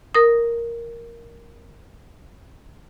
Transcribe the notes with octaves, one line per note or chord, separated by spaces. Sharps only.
A#4 D#6